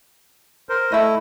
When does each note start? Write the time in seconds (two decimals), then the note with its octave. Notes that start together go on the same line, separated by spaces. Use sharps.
0.69 A#4 C5
0.92 A3 E4 D#5 E5